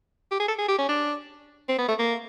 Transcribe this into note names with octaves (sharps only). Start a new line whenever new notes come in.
G4
G#4
A4
G#4
G4
C#4
D4
C4
B3
A3
A#3